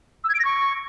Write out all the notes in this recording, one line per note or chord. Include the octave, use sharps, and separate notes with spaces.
E6
G#6
D7
A#6
C#6